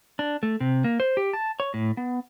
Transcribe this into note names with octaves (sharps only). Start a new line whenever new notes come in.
D4
A3
C3
A#3
C5
G4
A5
C#5
A2
B3